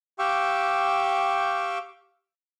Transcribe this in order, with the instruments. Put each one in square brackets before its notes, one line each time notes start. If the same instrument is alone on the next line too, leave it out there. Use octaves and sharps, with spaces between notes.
[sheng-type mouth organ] G4 F5 G5 C#6 D6 E6